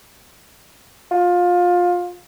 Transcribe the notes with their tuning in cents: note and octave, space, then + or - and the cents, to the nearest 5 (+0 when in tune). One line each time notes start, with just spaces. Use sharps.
F4 +20